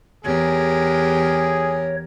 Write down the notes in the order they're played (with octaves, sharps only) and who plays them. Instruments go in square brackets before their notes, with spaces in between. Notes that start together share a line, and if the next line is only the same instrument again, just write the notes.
[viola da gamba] E2 G4 A#4 [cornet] G#4 [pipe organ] C#5